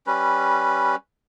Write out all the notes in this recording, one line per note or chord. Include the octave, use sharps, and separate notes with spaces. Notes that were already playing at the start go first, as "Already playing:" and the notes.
G3 C#4 B4